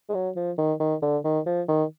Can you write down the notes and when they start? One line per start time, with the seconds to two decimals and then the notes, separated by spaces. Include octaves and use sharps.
0.09 G#3
0.14 F#3
0.36 F3
0.58 D#3
0.80 D#3
1.02 D3
1.24 D#3
1.46 F3
1.68 D#3